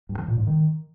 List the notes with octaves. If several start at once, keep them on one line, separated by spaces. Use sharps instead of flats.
G2
E3
A#2
G#2
D#3